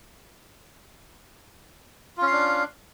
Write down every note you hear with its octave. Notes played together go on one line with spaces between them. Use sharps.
C#4 D4 F4 F5